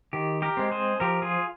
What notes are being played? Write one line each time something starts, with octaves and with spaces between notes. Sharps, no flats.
D#3 G4
G4 A#4
G#3 C4
G#4 C5
F3 G4 A#4
F4 G#4